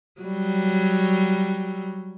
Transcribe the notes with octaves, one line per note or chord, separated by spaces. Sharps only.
F#3 G3